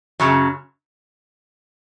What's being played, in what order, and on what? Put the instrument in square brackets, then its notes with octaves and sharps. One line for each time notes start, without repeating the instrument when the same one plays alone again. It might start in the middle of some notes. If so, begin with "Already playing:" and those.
[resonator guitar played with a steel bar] F#2 C#3 F#3